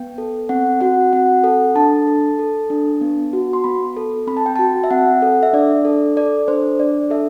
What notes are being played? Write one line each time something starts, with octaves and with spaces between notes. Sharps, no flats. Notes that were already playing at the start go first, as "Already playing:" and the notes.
Already playing: B3 G5
A4
C4 F#5
F#4 F#5
C4 F#5
A4
D4 A5
A4
A4
D4
B3
F#4
C6
B3 B5
A4
C4 B5
A5
G5
F#4 A5
E5
C4 F#5
A4
E5
D4 D5
A4
A4 D5
D4 C5
D4 D5
A4 E5